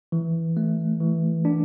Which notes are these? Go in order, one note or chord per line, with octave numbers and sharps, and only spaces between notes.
E3
A3
E3
D4